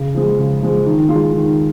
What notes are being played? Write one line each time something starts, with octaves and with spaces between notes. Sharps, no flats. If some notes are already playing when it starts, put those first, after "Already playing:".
Already playing: C#3
F3 G#3
C#3
F3 G#3
D#3
G#3 F4
D#3